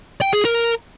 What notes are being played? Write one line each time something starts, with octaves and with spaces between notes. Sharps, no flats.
G5
G#4
A#4